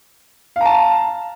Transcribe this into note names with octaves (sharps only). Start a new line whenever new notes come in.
F5 A5 A#5